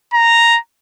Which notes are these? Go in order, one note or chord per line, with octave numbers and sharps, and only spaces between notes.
A#5